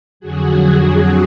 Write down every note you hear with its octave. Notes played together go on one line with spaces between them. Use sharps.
F2 D3 F#3 F#4 G#4